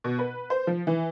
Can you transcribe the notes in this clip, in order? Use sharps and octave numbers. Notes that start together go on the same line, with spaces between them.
B2
B4
C5
F3
E3